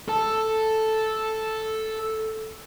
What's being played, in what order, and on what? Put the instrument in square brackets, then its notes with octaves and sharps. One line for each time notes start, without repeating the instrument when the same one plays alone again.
[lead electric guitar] A4 A5